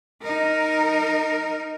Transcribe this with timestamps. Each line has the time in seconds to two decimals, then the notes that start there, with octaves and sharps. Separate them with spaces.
0.22 D#4 A#4